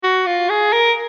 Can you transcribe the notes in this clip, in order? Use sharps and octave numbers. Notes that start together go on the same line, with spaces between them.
F#4
F4
G#4
A#4